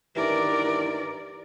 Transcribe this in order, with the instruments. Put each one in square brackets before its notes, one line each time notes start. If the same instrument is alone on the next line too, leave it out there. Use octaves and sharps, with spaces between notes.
[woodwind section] G2 D#3 E3 [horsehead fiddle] A#4 D5